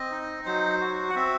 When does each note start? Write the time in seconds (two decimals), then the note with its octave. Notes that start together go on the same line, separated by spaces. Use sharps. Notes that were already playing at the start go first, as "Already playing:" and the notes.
Already playing: C4 D#5
0.11 D#4
0.46 F#3 C5
0.81 F#4
1.10 F#5
1.16 C4 E5